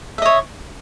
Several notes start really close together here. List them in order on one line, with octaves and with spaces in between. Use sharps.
E5 D#5 C#5